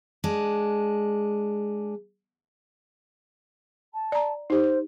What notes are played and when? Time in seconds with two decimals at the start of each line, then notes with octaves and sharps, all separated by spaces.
0.24 G#3 D4
3.93 A5
4.12 D5 A#5
4.50 D#4 G4 C5